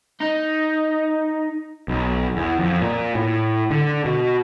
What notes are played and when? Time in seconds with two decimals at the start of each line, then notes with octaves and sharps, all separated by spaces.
0.20 D#4
1.88 B1
2.36 E2
2.59 F2
2.82 A#2
3.15 A2
3.71 D3
4.05 B2